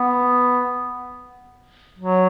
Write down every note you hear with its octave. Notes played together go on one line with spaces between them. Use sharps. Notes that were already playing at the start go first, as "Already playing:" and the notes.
Already playing: B3
F#3